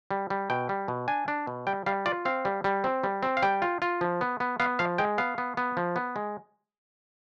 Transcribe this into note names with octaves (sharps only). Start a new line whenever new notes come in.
G3
G3
B2 G5
G3
B2
D4 G#5
D4
B2
G3 G5
G3 F5
F4 D5
C4 F5
G3
G3
C4
G3
C4
F5
G3 G5
F4
F4
F3
B3
B3
B3 F5
F3 F5
G#3 G5
B3 F5
B3
B3
F3
B3
G#3